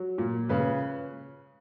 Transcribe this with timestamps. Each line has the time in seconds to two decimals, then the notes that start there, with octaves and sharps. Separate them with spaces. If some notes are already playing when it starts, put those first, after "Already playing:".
Already playing: F#3
0.18 A#2
0.49 C#3 B4